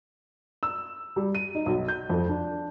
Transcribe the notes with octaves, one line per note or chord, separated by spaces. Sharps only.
E6
G3
D#7
D#4
B1
G6
F2
D4